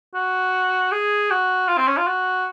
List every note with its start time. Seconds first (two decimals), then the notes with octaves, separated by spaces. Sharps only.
0.15 F#4
0.92 G#4
1.31 F#4
1.68 F4
1.78 C4
1.87 C#4
1.97 F4
2.07 F#4